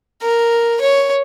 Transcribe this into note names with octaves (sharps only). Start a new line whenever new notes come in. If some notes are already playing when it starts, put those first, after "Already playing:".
A#4
C#5